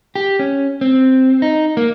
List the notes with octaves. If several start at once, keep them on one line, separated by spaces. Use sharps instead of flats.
G4
C#4
C4
D#4
A#3